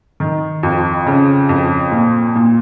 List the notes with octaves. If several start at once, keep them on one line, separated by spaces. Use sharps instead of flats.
D#3
F2
C#3
F2
A#2
A#2